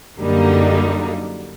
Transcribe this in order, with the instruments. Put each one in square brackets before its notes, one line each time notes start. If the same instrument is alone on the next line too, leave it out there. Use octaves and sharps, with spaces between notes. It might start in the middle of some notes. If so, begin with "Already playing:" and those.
[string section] F#2 D3 G3 A#3 D#4